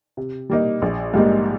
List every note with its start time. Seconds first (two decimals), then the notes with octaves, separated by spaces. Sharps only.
0.17 C3
0.50 G3 A#3 D#4
0.82 A#1
1.14 G#2 G3 A#3 D#4